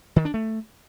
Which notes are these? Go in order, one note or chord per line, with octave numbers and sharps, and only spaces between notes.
D#3
D4
A3